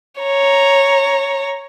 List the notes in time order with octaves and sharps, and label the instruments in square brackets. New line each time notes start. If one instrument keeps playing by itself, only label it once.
[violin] C#5 A#5